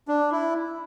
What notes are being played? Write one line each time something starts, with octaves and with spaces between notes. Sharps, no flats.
D4
E4